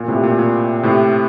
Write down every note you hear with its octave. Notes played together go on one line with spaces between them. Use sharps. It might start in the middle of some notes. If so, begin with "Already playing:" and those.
Already playing: A#2
A2 C3
A#2
A#2
A2 C3